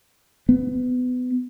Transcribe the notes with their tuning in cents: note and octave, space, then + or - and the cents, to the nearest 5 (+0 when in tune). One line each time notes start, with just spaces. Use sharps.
B3 +25